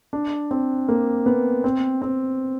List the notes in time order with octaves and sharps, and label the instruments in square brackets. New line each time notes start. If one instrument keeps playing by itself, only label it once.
[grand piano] D4
C4
A#3
B3
C4
C4